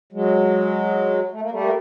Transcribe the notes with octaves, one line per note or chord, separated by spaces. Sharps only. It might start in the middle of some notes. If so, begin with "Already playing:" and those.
F#3 G#3
A3
A#3
G3 A3
A#3